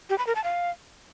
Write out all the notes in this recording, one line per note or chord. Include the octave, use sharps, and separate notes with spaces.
G4
B5
A#4
A5
F5